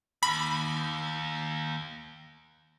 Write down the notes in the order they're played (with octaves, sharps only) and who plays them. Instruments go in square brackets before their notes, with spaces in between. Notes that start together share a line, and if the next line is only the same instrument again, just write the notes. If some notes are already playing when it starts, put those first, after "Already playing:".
[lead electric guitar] D#2 [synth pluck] B5